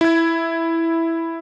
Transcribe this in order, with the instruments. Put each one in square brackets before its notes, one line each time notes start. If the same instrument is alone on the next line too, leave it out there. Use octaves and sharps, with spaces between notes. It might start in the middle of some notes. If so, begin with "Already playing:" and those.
[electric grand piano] E4 G#6